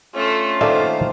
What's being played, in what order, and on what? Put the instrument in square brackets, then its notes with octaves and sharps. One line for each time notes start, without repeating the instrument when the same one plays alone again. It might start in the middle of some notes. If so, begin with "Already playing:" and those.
[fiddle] A3 A4 [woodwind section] C#4 D4 F4
[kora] D#3 A3 A#3 [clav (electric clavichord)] A4 D5 E5 [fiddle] C5